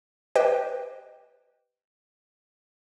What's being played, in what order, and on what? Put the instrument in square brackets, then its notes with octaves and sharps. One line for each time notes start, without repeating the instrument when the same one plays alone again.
[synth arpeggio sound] G4 B4 C5 D#5 G5